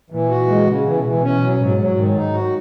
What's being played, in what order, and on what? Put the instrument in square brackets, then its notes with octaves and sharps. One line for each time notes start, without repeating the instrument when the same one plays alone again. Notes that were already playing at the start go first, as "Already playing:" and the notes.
[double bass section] A#2 [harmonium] E3
[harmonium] F#4
G#3
C#3
[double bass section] B2 [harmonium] E3
[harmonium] E3
C#4
F#3
[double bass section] G#2 [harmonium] F#3
[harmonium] F#3
[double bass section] G#2 [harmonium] D#3
[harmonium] D#4
F#4